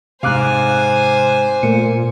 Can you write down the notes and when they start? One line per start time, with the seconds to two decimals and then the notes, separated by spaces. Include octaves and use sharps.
0.23 G#2 C3 C5 F5 G#5 D6 F#6
1.63 A#2 A3 C#7